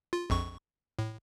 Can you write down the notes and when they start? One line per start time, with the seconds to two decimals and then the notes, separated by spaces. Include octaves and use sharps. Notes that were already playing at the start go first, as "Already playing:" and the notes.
0.13 F4
0.30 A#1 F2 C#6
0.99 A2